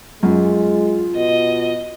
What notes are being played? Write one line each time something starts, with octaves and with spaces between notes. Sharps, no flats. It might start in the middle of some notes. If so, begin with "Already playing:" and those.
F#2 G#3 F4
B2 D#5